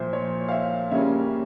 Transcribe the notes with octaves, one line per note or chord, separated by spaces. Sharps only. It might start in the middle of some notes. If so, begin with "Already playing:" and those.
Already playing: A#2 F3 C5 E5
C#5
F5
E5
C#3 G3 A#3 C#4 E5